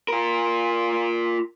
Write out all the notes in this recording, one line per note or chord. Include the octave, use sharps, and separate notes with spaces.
F4 A#4